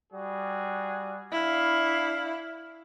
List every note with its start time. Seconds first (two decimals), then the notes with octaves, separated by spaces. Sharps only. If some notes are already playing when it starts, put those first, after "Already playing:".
0.13 G3 F#4 G#4
1.32 D4 E4 F5